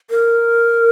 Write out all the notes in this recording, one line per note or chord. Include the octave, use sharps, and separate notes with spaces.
A#4